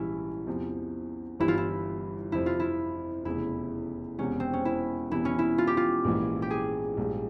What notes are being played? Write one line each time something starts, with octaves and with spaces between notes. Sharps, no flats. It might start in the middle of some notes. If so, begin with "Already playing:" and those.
Already playing: A#1 G#2 E3 G3 C#4 E4
E2 C3 F3
G1 G2 E3 G3 E4
F4
E4
F2 C3 F3 E4
F4
E4
F1 E2 C#3 E4
E1 E2 C3 C#4
C4
C#4
E4
E1 E2 C3 E3 E4
C#4
E4
F4
G4
F4
A#1 G#2 E3 A#3 E4
G4
G#4
A#1 G#2 G3